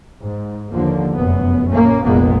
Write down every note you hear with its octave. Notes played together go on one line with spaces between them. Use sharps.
G#2
D#2 D3 F3 A#3
F1 F#2 B3
A#1 A#3 C#4
F1 A#1 G#3 A#3 B3